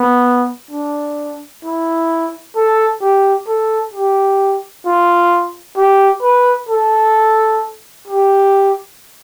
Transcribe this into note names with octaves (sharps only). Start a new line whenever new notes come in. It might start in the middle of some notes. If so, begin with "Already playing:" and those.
Already playing: B3
D4
E4
A4
G4
A4
G4
F4
G4
B4
A4
G4